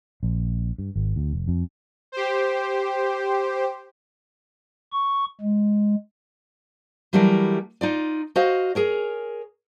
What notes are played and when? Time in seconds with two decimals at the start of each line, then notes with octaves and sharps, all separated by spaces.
0.23 A#1
0.78 G2
0.96 G#1
1.16 D2
1.33 F1
1.48 F2
2.12 G4 C5
4.93 C#6
5.41 G#3
7.13 E3 F#3 G3 A3 E4 A#4
7.81 D#4 F4 D5
8.36 F#4 C5 D#5 F5
8.75 G#4 A#4 C#5